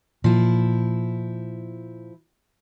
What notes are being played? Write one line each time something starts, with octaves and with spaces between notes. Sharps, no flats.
A#2 F3 E4